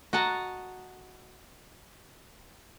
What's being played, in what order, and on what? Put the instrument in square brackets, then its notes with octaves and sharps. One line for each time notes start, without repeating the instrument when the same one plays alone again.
[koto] F#4 D#5 F#5 A5 A#5